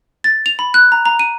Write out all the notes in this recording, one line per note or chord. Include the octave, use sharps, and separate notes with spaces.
A6
F7
B5
F#6
A#5
A#5
D#7